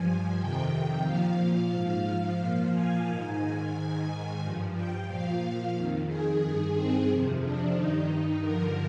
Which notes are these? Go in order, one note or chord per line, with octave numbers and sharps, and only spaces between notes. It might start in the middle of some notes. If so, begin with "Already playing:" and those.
Already playing: G2 F3 G#5
F2 C3 D#3 G5
A#2 F3 F5
F5
G#2 F3
F5
A#2 F3
G#5
G#2 D#3
G#2 D#3 G#5
G2 F3
G5
A#2 F3 F5
F2 D#3
G#4
G2 D#3
C4
F2 C3 F3
D4
G2 D#3 D#4
G2 D3 F3 A#4